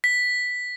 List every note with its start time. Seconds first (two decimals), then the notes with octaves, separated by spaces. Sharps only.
0.04 B6